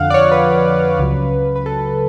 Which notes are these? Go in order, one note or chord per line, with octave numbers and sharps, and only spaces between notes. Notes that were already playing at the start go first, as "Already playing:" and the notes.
Already playing: F2 D3 F3 F5 F#5
D5
C#5
B4
C#2 C#3 F#3
B4
A4